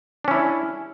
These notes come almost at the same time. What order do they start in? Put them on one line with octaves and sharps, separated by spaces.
D4 C#4 E4